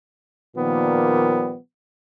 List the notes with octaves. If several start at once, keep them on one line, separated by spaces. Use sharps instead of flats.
A#2 D#3 F3 G3 A#3 B3